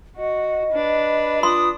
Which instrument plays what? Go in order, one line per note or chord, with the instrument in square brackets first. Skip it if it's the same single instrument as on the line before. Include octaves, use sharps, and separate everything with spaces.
[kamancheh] F#4 [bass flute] D#5
[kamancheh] D4 B4
[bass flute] F4 [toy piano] C6 [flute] D#6